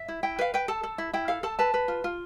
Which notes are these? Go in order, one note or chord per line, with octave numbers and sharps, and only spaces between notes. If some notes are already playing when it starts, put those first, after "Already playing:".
Already playing: E5
E4
E4 G5
B4 F5
B4 G5
A4 A5
A4
E4
E4 G5
A4 F5
A4 A5
B4 A5
B4
F4
F4